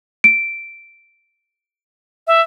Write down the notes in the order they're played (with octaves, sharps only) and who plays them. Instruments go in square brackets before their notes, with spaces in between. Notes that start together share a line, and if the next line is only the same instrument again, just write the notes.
[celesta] D7
[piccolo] E5